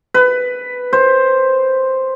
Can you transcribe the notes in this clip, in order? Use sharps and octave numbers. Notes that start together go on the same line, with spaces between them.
B4
C5